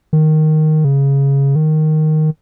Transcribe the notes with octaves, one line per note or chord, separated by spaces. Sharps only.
D#3
C#3
D#3